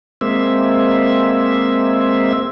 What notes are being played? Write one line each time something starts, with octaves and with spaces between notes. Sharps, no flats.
G#3 A#3 C4 E5